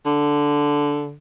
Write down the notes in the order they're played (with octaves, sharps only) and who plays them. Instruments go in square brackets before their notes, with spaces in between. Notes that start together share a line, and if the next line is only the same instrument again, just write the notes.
[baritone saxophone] D3